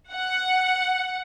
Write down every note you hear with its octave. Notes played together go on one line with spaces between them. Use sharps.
F#5